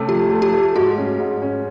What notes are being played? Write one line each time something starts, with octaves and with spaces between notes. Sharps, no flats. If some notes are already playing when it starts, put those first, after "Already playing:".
Already playing: C3 A3 C#4
F3 G4
A3
G4
A3
G#2 F#4
C#4
G#2
C#4